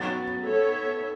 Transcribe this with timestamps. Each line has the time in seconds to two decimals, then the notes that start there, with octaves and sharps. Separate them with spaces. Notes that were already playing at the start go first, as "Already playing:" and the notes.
Already playing: F#3 B3 F#4 A6
0.46 B3 A4 C#5 E5